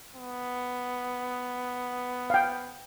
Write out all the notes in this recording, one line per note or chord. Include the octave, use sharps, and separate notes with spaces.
B3
F5 G5